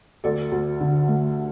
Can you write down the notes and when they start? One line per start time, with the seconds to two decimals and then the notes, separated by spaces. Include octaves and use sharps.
0.24 D2 A4 D5
0.52 D2
0.81 D3
1.08 A3